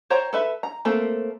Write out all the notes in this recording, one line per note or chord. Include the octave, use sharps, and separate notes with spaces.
C5 C#5 G5 A#5
A4 B4 E5
A#5
A3 A#3 C4 A4 A#4